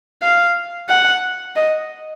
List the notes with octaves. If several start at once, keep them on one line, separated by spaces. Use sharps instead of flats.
F5
F#5
D#5